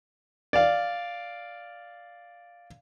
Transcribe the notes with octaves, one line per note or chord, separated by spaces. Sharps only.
D5 F5